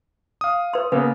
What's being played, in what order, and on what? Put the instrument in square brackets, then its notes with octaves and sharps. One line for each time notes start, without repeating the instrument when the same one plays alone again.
[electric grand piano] F5 D#6
[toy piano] B4 C6
[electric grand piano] C#3 A#3 B3 [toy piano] B4